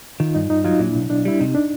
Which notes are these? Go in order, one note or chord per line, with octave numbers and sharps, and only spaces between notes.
D#3 D#4 F4
G2 D#4
G2 D#4
F#3 D#4 F4
A#2 D4 E4
B1
B1 D4
G3 E4
C3 D#4
D4